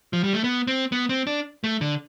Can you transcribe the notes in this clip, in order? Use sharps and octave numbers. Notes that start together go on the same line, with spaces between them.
F3
G3
A3
B3
C4
B3
C4
D4
A3
D3